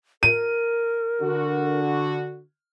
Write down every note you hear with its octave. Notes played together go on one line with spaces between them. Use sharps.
A#4 D#7
D3 F#4